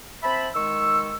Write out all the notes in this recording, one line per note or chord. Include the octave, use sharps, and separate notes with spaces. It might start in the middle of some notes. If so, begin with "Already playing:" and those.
C4 C5 E5 A5 B5
D#3 G#3 C#6 E6